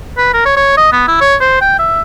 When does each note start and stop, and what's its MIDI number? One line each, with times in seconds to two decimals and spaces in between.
0.17 0.29 71
0.33 0.45 70
0.45 0.52 73
0.57 0.74 73
0.77 0.92 75
0.92 1.07 59
1.08 1.19 64
1.21 1.35 73
1.40 1.58 72
1.61 1.77 79
1.79 2.01 76